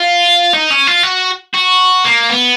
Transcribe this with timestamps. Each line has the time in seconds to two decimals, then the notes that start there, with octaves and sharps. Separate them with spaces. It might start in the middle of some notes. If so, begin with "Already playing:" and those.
Already playing: F4
0.53 D#4
0.70 C#4
0.87 F4
1.03 F#4
1.54 F#4
2.05 A#3
2.30 B3